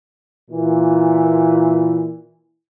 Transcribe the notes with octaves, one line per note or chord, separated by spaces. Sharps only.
A#2 E3